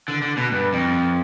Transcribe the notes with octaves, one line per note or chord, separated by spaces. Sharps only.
D3
D3
B2
G2
F2